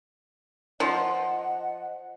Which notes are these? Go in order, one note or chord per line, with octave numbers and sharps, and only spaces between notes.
F3 D#5 F#5